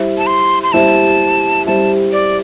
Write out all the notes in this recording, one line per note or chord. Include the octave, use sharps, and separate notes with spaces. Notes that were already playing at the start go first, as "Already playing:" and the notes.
Already playing: G3 E4 C5 E5
A5
C6
C6
G3 E4 C5 E5 A5
G3 E4 C5 E5 A5
D5